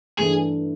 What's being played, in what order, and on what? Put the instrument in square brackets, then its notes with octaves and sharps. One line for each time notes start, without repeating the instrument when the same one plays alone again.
[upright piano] G2 E3 A3 D4 [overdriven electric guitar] G#4